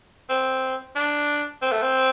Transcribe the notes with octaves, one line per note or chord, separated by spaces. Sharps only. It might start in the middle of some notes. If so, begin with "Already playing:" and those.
C4
D4
C4
A3
C4